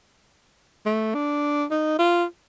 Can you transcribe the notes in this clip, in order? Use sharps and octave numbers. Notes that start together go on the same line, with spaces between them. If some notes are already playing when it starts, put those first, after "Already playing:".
A3
D4
D#4
F4